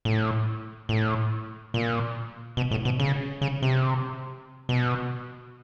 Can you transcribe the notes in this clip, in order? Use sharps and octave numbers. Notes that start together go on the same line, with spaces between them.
A2
A2
A#2
B2
A2
B2
C#3
C#3
C3
B2